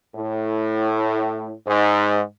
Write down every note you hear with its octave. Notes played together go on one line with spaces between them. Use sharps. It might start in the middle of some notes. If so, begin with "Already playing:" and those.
A2
G#2